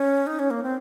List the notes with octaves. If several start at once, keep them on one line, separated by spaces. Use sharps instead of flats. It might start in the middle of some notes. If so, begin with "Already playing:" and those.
Already playing: C#4
D#4
C#4
A#3
C4